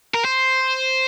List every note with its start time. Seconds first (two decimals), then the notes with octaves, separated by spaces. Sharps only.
0.14 A#4
0.24 C5